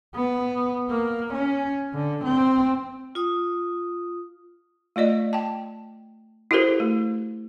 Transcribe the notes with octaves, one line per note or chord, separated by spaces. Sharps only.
B3
A#3
C#4
D3
C4
F4 D#6
A3 F4 D5 D#5
G5 A5
E4 F#4 G4 A4 A#4 C5
A3